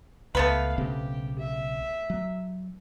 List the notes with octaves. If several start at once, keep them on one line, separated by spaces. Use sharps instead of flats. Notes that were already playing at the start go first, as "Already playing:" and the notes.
C#2 A3 B3 B4 F5
B1 C#3 C4 G4
E5
F#3